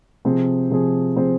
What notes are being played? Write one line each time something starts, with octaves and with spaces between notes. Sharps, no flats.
C3 F3 C4 G#4 C5
C3 F3 C4 G#4 C5
C3 F3 C4 G#4 C5